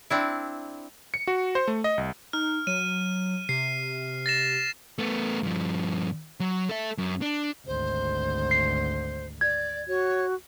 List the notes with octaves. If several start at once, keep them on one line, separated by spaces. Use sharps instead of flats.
C4 D4 E4
C#7
F#4
C5
A3
D#5
C2
D#4 F6
F#3 D#7
C3 C7
A6 A#6 E7
A3 B3
G2 F3
F#3
A4 E5
F#2
D4
G#1 D2 C5
C7
D5 G#6
F#4 C#5